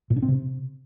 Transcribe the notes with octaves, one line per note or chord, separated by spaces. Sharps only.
A#2
D4
C4
C3